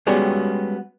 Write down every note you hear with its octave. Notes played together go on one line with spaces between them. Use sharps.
G3 G#3 B3 C#4 F#4 G4